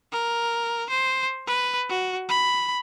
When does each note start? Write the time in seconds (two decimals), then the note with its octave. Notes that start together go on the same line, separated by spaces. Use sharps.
0.12 A#4
0.90 C5
1.47 B4
1.89 F#4
2.29 B5